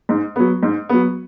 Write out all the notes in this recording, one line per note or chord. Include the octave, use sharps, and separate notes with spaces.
G#2
F#3 B3
G#2
F#3 B3